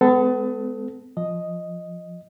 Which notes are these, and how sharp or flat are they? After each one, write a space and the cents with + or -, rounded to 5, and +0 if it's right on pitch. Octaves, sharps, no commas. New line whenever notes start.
G#3 +5 B3 +35 A4 +0
F3 +0 D#5 +0